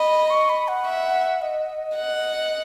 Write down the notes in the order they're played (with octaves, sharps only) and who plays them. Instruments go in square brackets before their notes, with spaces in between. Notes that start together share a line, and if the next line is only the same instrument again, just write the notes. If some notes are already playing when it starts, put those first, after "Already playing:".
Already playing: [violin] D#5 [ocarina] B5
[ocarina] C#6
B5
F#5
[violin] E5
[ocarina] D#5
[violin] F#5